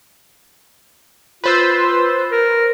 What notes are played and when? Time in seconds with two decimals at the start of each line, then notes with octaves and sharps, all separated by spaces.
1.44 F4 B4 C5 E6
2.32 A#4